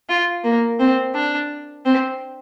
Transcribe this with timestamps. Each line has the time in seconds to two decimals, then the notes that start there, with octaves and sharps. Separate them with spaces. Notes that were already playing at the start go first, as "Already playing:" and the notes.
0.09 F4
0.44 A#3
0.80 C4
1.15 D4
1.85 C4